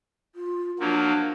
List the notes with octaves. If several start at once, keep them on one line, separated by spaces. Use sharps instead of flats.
F4
F3 F#3 A#3 D4